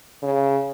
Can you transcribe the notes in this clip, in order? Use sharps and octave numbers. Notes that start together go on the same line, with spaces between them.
C#3